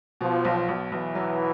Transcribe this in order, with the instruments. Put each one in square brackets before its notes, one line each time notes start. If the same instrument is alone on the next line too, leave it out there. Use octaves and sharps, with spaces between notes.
[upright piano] B2 [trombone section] F3
[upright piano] B1
B1
[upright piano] B1 [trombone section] E3
[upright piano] F#3